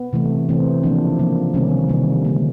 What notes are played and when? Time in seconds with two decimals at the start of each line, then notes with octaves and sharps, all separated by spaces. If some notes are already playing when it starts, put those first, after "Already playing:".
Already playing: B3
0.13 C3 E3 A3
0.49 C3 E3 A3 C4
0.83 C#3 F3 A#3 D4
1.19 C#3 F3 A#3
1.54 C3 D#3 G3 A#3 C#4
1.89 C3 D#3 G3 A#3
2.25 D3 F3 G#3 A#3